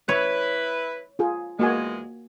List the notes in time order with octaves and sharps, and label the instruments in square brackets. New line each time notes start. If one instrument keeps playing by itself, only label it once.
[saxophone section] E4 B4 [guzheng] C#5
[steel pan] F4 G#4
[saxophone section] E2 G#3 [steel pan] A#3 F#4 G#5